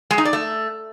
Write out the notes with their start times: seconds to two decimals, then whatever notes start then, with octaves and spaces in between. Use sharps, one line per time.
0.11 G#3
0.18 D#4
0.25 D5
0.33 A3